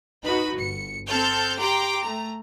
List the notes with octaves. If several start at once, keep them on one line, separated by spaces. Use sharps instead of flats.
D#4 F#4 B4 B5
G1 C#7
C4 A4 A5 F6 G6
G4 G5 A#5 C6 D6
A3 A#5